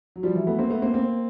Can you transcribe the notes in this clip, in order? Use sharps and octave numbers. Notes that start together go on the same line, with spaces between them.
F#3
F3 G3
E3 F#3
A3 B3
A#3 C4
A3 B3
A#3 C4
A#3 C4